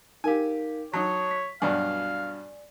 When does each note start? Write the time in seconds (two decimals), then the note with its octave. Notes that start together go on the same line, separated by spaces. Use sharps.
0.24 D#4 G4 A#4 F5 G#5
0.93 F#3 D#4 C#5 A5 D#6
1.31 B6
1.62 G2 B2 F#3 D5 F5 G#5